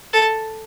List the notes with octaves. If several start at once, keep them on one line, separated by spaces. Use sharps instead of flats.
A4